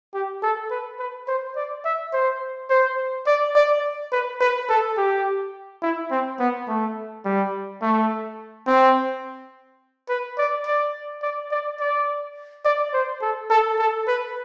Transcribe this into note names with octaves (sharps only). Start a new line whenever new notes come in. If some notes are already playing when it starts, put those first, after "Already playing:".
G4
A4
B4
B4
C5
D5
E5
C5
C5
D5
D5
B4
B4
A4
G4
E4
C4
B3
A3
G3
A3
C4
B4
D5
D5
D5
D5
D5
D5
C5
A4
A4
A4
B4